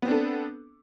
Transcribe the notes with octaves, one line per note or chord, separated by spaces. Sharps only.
B3 C4 D4 A4